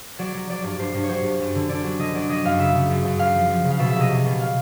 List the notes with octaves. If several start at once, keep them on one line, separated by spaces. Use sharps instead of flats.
F#3 D5
F#3
F#3 D5
G2 D5
G2 C5
G2
C#5
F#3 C5
G2
F#2
D3
D3 D5
F#3
D3 D#5
F#3 D5
F#3 D#5
F#2 F5
C#3 E5
C#3
F#2
F#2
F#2 F5
F3
F3
C#3
F5
B2 E5
E5
C2 D#5
C2
B2
F5